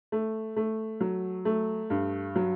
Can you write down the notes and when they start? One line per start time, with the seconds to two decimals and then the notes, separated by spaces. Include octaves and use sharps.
0.12 A3
0.56 A3
1.01 F#3
1.45 A3
1.90 G2
2.36 F#3